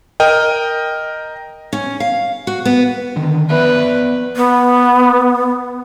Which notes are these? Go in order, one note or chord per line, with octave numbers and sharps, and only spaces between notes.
A#4 D#5 G5
C#4
F5
F#4
B3
D3 D#3
B3 B4 D5 E5
B3